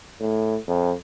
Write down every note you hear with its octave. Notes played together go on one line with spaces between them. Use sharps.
A2
F2